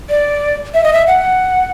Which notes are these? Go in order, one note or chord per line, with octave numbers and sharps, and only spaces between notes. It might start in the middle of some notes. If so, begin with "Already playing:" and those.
D5
E5
D#5
E5
F#5